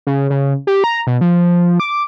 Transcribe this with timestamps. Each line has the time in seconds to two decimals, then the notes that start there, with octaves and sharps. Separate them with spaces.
0.07 C#3
0.30 C#3
0.67 G4
0.84 A#5
1.07 B2
1.21 F3
1.80 D6